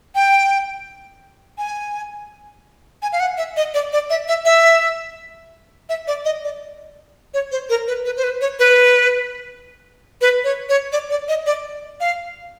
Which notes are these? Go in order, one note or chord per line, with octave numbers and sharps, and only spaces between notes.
G5
G#5
G#5
F5
F#5
E5
D#5
D5
D5
E5
E5
E5
E5
D5
D#5
D5
C#5
C5
A#4
B4
B4
C5
B4
C#5
B4
B4
C#5
C#5
D5
D5
D#5
D5
F5